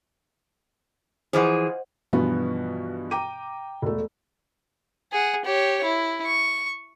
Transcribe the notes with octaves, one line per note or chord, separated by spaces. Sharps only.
E3 F3 G#4 C5 D#5 F#5
G2 B2 E3 F3 B3 F#4
G5 A#5 D6 D#7
E1 A3
G#4 F#5
G4 C#5
E4
C#6